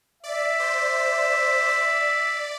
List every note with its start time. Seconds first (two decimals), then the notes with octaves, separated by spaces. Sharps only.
0.23 D5 E5
0.60 C5
1.69 D5